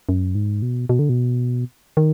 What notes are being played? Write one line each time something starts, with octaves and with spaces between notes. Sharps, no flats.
F#2
G#2
B2
B2
D3
B2
D#3